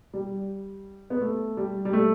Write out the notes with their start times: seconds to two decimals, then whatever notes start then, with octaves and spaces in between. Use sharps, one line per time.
0.14 G3
1.10 B3
1.21 A3
1.57 G3
1.85 G3
1.93 A3